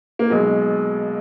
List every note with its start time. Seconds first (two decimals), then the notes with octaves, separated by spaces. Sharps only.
0.19 A#3
0.30 B1 B2 G#3